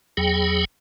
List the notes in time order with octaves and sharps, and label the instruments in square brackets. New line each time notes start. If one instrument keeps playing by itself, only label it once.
[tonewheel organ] E2 F#3 G#4 G5